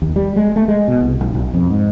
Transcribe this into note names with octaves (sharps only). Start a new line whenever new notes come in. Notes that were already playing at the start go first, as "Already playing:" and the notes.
D#2
G3
G#3
A3
G#3
B2
C2
B1
B1
F2
G#2